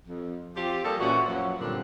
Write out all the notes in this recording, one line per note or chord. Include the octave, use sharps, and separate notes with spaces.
F2
F3 C4 F4 G4
F3 G3 A#3 G#4 A4
A#2 E3 C#4 F#4
F#2 F3 F#3
G2 A#2 D3 C4 D4